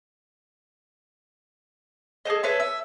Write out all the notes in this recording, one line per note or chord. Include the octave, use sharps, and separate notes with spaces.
G#4 A4 C5 D#5
B4 C#5 E5 A5
E5